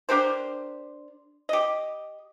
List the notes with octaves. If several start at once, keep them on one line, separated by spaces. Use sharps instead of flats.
D4 G4 A#4 C5
G4 D#5